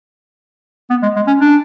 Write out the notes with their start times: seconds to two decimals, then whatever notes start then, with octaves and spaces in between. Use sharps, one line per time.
0.90 B3
1.03 G#3
1.16 G#3
1.27 C#4
1.41 D4